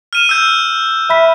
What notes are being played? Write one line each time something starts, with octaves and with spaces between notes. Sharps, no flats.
F6 D#7 E7
E6 G6
E5 B5 B6